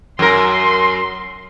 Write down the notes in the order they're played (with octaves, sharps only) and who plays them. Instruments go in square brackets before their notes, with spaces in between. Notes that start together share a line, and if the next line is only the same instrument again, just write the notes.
[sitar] F#2 A#4 [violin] C6